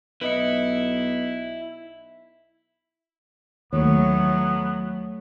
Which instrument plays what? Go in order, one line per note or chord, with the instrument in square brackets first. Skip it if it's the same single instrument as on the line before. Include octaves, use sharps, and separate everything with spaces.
[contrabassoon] B1 [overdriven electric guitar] E4 [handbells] B4 D#5 C#7
[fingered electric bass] D#2 [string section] F#3 [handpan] A3 C#5 [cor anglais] B3